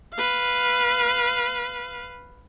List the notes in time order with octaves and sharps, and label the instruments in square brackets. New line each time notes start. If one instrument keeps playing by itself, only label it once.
[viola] B4 F5